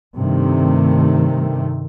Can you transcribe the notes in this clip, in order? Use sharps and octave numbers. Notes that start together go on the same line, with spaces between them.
G2 C3 D#3 A3